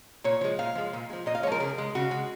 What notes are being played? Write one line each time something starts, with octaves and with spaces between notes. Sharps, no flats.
A#2 C#5
F3 G#3
A#2 F5
F3 G#3
A#2
F3 G#3
A#2 D#5
F5
F3 G#3 A#4 C#5
C#3 G#4
G#3
C#3 F#4
G#3